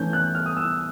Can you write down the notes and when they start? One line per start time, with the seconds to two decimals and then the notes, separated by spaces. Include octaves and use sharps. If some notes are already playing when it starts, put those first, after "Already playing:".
Already playing: E3 A3 C#4 G6
0.13 F#6
0.35 F6
0.46 D#6
0.57 E6